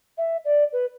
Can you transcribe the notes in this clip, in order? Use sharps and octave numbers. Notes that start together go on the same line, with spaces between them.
E5
D5
B4